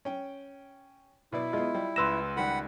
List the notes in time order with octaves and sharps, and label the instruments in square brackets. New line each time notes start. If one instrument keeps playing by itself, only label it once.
[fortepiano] C#4 G5
[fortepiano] B2 B4 D5 [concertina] E4
[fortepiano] G#3 B3 [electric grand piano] F4 [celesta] D#5
[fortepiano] G3
[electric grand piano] C#2 B4 A#6 [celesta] C6 E6 E7
[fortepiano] D#3 G3 [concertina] F#5 B5